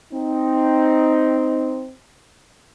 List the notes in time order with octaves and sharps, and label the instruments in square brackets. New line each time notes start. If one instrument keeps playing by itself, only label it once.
[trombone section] C4 D#4